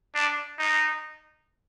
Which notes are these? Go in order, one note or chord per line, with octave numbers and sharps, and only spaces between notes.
D4
D#4